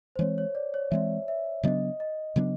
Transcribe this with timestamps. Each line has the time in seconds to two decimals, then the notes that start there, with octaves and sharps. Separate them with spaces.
0.16 C5
0.19 E3 G#3 C4 C#5
0.38 C#5
0.55 D5
0.74 C#5
0.91 E3 G#3 C4 E5
1.28 E5
1.63 C#3 F#3 B3 D4 D#5
2.00 D#5
2.36 C#3 F#3 B3 D4